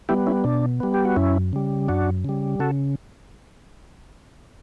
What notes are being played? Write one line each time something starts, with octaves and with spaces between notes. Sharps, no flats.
G3 B3 E4 G4
C#4 E4
B2 D4
G3 B3
G4
F#4
F#2 C#4 E4
C#3 G3
F#2 D4 F#4
C#3 G3
C#3 F#4 A4